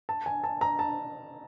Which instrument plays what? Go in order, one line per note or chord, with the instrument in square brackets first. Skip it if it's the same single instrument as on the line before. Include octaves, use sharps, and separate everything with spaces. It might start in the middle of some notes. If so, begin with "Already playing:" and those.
[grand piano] A5
G#5
A5
A#5
A5